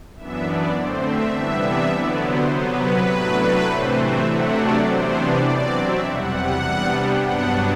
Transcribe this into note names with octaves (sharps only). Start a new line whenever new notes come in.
F#2 E3 B3 D4 E5
D5
D3 A3 C4 C5
E5
C3 E3 G3 B3 D4 E5
E5
D3 F#3 B3 D5
C5
C3 F#3 B3 B4
B4
A2 F#3 A3 D4
B4
C3 E3 A3 C4 C5
E5
C3 F#3 A3 D4 F#5
D5
C3 E3 B3 D4 C5
D5
B2 F#3 C4 D5
E5
E2 C3 G3 F#5
C3 G3 B3 D4
G5
G2 F#3 B3 D4 F#5